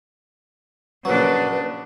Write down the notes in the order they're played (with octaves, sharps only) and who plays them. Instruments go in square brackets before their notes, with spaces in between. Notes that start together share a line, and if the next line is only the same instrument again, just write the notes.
[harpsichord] A#1 F#3 [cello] C#3 D4 [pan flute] B4